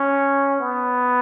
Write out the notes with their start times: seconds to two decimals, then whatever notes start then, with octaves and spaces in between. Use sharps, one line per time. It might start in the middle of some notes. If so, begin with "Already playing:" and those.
Already playing: C#4
0.60 B3